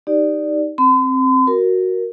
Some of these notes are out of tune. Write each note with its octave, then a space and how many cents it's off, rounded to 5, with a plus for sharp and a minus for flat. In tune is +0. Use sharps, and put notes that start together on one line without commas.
D#4 +0 G4 -10 D5 +5
C4 +10 C6 -45
F#4 +0 A#4 +0